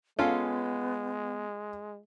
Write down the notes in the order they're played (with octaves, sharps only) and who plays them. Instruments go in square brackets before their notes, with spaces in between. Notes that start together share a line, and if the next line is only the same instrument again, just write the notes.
[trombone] G#3 [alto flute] B3 [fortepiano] C#4 A4 F5 [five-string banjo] F4